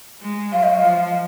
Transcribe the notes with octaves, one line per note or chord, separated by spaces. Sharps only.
G#3
F#3 F5
D#5
F5
F3